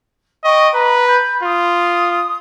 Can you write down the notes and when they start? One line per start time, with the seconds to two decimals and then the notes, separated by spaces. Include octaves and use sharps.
0.44 D#5 G5 C#6
0.74 B4 A#5
1.07 B5 G6
1.43 F4 D#6